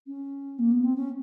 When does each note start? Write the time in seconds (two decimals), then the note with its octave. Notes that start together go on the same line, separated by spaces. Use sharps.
0.07 C#4
0.59 A#3
0.71 B3
0.84 C4
0.96 C#4